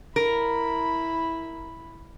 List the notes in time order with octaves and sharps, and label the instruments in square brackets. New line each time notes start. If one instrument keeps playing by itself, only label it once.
[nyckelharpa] E4 B5 [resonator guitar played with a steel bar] A#4